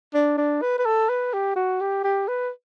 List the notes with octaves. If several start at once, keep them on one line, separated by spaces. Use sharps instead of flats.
D4
D4
B4
B4
A4
B4
G4
F#4
G4
G4
B4